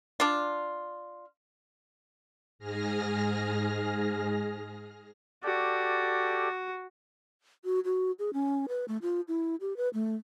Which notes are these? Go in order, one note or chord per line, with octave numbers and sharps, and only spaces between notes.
D4 F4
G#2 G#4 F6 A#6
F#4 G4 A4 D5
F#4
F#4
G#4
C#4
B4
A3
F4
E4
G4
B4
A3